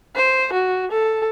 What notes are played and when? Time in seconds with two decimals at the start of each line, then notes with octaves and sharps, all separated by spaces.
0.16 C5
0.53 F#4
0.91 A4